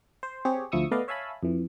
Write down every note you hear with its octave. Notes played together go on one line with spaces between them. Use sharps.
C5
C4 G4 G#4 C#5
D2 F3 E4 C#6 D#6 E6
A3 B3 B4 D5 D#5 F5
C#5 E5 F5 G#5 A5 B5
F2 E3